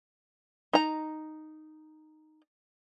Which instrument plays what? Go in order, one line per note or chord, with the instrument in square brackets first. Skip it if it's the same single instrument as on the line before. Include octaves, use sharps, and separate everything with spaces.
[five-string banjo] D#4 A#5